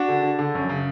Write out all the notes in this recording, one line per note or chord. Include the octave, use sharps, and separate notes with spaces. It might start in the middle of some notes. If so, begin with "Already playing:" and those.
Already playing: D4 F#4
D3
D3
D3
F#2
C#3